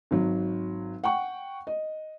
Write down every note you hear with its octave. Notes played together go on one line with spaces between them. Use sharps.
G#1 F#3
F#5 G5 C#6
D#5